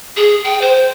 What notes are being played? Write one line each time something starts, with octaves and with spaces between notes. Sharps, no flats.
G#4
G5
C5